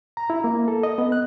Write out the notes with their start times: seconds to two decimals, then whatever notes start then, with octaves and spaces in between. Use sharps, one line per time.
0.17 A#5
0.30 E4
0.44 A#3
0.68 A4
0.83 D#5
0.98 B3
1.12 F#6